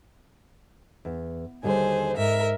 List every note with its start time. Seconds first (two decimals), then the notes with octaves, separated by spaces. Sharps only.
1.05 E2
1.63 D#2 D3 G3 G#4 C5
2.17 G#2 A#4 E5